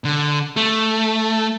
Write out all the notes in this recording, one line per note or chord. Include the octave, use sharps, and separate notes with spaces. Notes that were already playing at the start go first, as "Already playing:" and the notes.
D3
A3